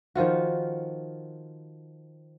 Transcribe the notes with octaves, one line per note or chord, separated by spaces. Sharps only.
D#3 F3 F4 F#4